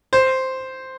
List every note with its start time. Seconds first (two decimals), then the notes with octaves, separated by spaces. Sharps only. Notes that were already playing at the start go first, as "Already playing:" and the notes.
0.13 C5